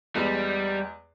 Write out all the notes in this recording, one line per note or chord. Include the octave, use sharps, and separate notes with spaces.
E2 G3 G#3 B4